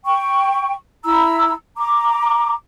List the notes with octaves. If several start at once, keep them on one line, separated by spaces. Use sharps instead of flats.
G5 C#6
E4 A#5 E6
A#5 D6